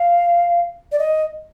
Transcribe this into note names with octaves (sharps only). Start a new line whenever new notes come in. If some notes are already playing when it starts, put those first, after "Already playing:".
Already playing: F5
D5
D#5